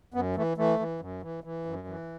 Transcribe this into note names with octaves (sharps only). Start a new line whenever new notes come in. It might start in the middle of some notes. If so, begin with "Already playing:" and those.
F#2 B3
E3 A3
E3 A3
E3
F#2
E3
E3
F#2
E3